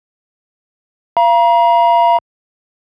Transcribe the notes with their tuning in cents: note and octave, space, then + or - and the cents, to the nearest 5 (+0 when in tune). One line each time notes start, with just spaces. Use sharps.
F5 -30 A#5 +35